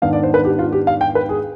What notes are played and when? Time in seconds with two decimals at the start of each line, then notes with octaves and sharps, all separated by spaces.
0.02 G#2 D#3 B3 D4 F5
0.13 D5
0.23 C5
0.34 B4
0.45 G4
0.59 F4
0.72 G4
0.87 F5
1.01 G5
1.15 B4
1.29 G#4